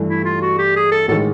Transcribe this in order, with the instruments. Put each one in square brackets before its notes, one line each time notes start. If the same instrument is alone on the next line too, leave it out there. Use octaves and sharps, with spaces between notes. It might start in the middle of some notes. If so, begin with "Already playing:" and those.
Already playing: [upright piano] G2 E3 A3
[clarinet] E4
F4
F#4
G4
G#4
A4
[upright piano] A1 D#3 G#3 [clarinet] A4